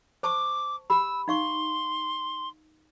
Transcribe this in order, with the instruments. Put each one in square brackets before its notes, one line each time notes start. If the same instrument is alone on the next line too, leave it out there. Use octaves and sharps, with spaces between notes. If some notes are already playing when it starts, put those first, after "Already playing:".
[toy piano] C5 A5 C#6 [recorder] D6
[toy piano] G4 B5 [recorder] E6
[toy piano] D#4 F5 C#6 [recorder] C6